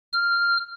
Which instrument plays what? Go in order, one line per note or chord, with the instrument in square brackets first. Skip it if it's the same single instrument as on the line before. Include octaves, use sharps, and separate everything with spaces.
[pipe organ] F6